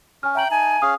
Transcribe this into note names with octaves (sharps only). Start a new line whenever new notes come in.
C#4 G#5 F6
E5 G5 A#5 F#7
D#4 G#5 A5
C#4 G#4 F5 D#6